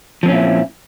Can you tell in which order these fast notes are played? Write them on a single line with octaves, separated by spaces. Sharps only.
F3 C4 C#4 A#2 E4